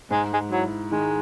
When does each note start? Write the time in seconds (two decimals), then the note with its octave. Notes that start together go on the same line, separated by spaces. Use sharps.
0.11 G#2 G#3
0.34 G#3
0.52 F#3 E4
0.92 D#3 G#3